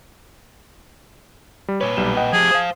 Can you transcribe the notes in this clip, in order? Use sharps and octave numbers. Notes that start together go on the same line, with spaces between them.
G3
A#2 B4 C#5
B1 G3 E7
D#5 F#5 G5
F3 G4 G#4
C5 F5 D#6